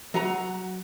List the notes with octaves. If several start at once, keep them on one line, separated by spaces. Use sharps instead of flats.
F#3 F#4 A#5